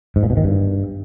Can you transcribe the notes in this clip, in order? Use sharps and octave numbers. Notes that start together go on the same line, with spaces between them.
G#2
A#2
B2
D#3
G2